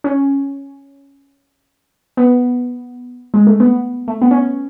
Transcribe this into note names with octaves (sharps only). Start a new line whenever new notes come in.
C#4
B3
G#3
A3
B3
A3
B3
C#4